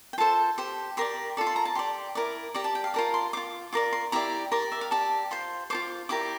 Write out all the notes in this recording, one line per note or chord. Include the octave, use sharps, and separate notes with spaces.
G5
F4 A4 C5 A5
G4 C5
G4 A#4 D5 C6
F4 A4 D5
C6
A#5
A5
G4 D5 C6
E4 A#4 D5
G4 D5 A#5
A5
G5
F5
F4 A#4 D5 A5
C6
F4 C5 D6
F4 A#4 D5 D6
C6
E4 G4 D5 A#5
G4 A#4 D5 C6
E5
F5
G4 D5 A5
F4 C5 C6
F4 A4 C5 D6
E4 G4 A#4 D5 D6